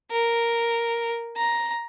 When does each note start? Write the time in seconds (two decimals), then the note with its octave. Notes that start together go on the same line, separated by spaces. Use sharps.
0.12 A#4
1.37 A#5